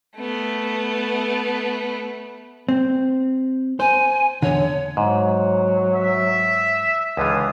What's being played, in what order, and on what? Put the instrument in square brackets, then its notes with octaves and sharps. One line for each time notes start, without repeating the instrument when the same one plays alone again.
[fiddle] A3 B3
[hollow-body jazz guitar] C4
[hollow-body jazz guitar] C5 [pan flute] G#5
[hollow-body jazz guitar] E2 D3 [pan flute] C#5
[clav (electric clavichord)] G#2 [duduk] F#3
[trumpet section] E5
[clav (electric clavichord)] C#2 D3 E3 [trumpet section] F4 G#4 D#6